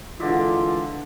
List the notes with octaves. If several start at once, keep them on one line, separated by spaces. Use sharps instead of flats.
D3 E3 G#3 F4 D5 E5